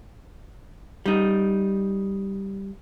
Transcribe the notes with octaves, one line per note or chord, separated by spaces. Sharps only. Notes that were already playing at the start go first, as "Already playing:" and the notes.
G3 D#4